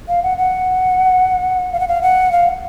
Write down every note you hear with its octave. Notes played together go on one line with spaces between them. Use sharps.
F5
F#5
F#5
F5
F#5
F5
F#5
F5